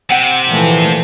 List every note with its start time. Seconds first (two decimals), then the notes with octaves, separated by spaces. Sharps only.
0.10 C3 F#5 G5
0.47 A#2 E3 F3 A3